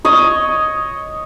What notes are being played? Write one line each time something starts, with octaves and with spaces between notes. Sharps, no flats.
C#5 D#5